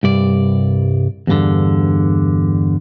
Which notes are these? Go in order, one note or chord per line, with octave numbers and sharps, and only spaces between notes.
C2 G2 D5
E2 G2 D3